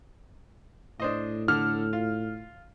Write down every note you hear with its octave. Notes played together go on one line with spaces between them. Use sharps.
A2 D4 C5 D#5
D3 A4 F6
F4